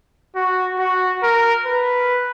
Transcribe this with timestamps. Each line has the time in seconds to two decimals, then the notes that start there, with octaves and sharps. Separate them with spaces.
0.36 F#4
0.79 F#4
1.23 A#4
1.66 B4